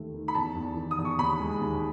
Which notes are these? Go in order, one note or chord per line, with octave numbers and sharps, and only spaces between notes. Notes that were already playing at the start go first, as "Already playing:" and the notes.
Already playing: D#2 D#3 A3
D#3
B5
E2 A5
E2
D#3
D#6
E2
C#6
D#2 B5
G#3
D#2